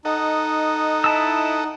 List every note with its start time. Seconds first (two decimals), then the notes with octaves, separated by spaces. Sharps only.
0.05 D#4 A4 D#5 F#5
1.04 E4 A5 E6